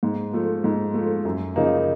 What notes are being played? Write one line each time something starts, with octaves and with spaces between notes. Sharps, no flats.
G#2
F3 A3
G#2
F3 A3
F#2
C#3 F3 A#3 D#4